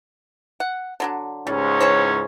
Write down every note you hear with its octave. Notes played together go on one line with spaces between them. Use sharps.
F#5
D3 F#3 D4
C#2 G#2 G3 C#4
E3 C5 C#5